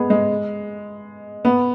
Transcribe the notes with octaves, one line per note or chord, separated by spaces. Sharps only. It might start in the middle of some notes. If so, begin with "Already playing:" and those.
Already playing: G#3 B3 G#4
G#3
B3